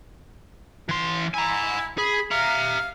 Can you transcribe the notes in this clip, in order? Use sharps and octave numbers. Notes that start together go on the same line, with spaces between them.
E3 C6
E4 G#5 A#5
G#4 B5
E5 F5 A#5